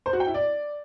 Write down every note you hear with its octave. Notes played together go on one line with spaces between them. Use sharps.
C5
F#4
G5
E4
D5